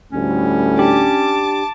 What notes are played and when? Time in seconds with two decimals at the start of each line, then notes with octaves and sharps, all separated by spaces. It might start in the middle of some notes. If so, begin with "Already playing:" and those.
0.13 D2 A2 G3 C#4
0.79 D4 G4 A5 D6